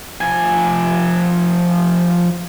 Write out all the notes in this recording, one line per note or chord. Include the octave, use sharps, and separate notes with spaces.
F3 G#5